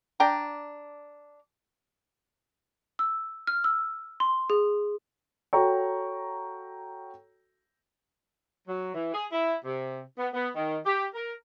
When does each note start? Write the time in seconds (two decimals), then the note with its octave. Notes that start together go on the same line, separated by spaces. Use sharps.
0.20 D4 G5 A#5
2.99 E6
3.47 F6
3.64 E6
4.20 C6
4.50 G#4
5.53 F#4 A4 C#5 G5 A#5 C#6
8.68 F#3
8.95 E3
9.14 G#4
9.32 E4
9.65 C3
10.18 B3
10.33 B3
10.55 D#3
10.85 G4
11.15 A#4